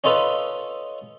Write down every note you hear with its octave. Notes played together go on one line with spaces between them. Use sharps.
C#4 D#4 F4 A4 B4